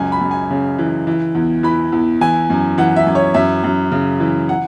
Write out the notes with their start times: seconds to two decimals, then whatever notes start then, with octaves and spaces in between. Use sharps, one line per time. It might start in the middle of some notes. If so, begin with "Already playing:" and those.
Already playing: C#2 F#2 G#5
0.12 B5
0.21 F#2
0.31 G#5
0.51 C#3
0.79 E3
1.07 E3
1.35 E2
1.63 E3 B5
1.92 E2
2.21 E3 G#5
2.50 F#2
2.78 E3 F#5
2.96 E5
3.07 F#2
3.15 C#5
3.34 F#2 E5
3.64 F#2
3.92 C#3
4.20 E3
4.49 F#5